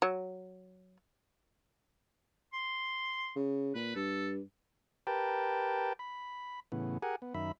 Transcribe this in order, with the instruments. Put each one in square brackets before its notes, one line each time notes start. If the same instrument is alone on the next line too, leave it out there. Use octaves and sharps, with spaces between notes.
[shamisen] F#3
[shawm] C6
[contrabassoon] C#3
[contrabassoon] A#2 [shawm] B4
[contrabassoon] G2 [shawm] A4
[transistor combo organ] G4 A#4 B4 G5 A5
B5
A2 C#3 E3 B3
G4 G#4 A#4 F#5 G#5
B3
F#2 D#3 E5 B5